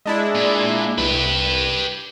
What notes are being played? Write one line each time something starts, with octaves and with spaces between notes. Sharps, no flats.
G#3 D4 E4
A#2
C2 G4 B4